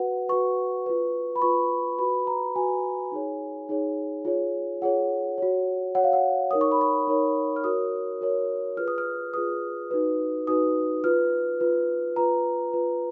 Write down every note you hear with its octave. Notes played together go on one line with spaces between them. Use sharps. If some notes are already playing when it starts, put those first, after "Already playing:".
Already playing: F#4 B4 F#5
F#4 B4 C#6
F4 B4
B5
F4 B4 C#6
F#4 B4 B5
A#5
F#4 B4 G#5
D#4 G#4 C#5
D#4 G#4 C#5
F4 G#4 C#5
F4 G#4 C#5 F#5
F#4 C#5
F#4 C#5 F#5
F5
F#5
D#4 A#4 C#5 D#6
C#6
B5
C#6
D#4 A#4 C#5
F6
F#4 A#4 C#5 D#6
F#4 A#4 C#5
F4 G#4 B4 F6
D#6
F6
F4 G#4 B4 D#6
D#4 F#4 B4
D#4 F#4 B4 D#6
F4 B4 F6
F4 B4
F4 B4 A#5
F4 B4